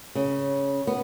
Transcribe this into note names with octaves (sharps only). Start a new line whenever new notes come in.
C#3
B3